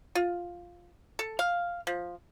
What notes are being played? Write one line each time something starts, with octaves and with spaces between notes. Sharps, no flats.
F4
A4
F5
F3